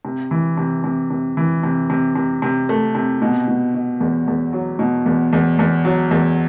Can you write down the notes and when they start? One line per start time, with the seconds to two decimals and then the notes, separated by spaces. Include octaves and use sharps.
0.05 C3
0.31 E3
0.57 C3
0.84 C3
1.10 C3
1.37 E3
1.63 C3
1.90 C3
2.16 C3
2.42 C3
2.69 A3
2.95 C3
3.22 B2
3.48 B2
3.74 B2
4.00 E2
4.28 E2
4.53 F#3
4.79 B2
5.06 E2
5.33 E2
5.59 E2
5.85 F#3
6.11 E2